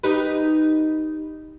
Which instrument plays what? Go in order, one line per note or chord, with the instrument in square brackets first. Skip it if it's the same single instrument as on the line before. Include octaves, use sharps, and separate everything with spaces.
[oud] D#4 G4 B4